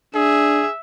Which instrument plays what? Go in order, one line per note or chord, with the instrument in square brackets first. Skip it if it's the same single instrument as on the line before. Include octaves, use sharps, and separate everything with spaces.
[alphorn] D4 [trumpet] G#4 [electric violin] E5